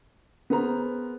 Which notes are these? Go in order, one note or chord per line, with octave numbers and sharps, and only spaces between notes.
B3 G#4 A#4 C5 A#5